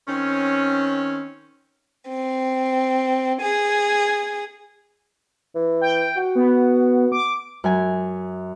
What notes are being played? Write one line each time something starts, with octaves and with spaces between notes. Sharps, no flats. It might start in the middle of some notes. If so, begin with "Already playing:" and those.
D#3 C4 C#4
C4
G#4
E3
G5
F#4
B3
D6
F#2 G#5